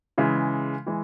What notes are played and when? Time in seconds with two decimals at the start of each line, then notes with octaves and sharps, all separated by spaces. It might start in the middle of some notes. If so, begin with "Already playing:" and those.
0.18 C#3 E3 G#3
0.86 E3 G#3